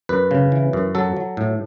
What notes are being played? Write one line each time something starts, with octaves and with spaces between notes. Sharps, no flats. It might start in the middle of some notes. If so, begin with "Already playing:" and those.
F#2 B4
C#3
E3
F#2
F#3 A4
F#3
A2